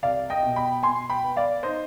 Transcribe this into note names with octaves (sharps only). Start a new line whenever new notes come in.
C2 D5 F5
D#5 G5
B2
G5 B5
B2 G#5 C6
G5 B5
B3
D5 F5
D#4 C5 D#5